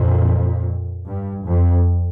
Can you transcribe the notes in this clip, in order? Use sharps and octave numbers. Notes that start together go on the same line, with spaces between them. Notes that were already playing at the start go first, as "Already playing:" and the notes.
Already playing: F2 A#2
G2
F2